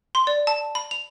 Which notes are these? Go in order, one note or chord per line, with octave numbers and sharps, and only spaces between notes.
C6
D5
A5
B5
F7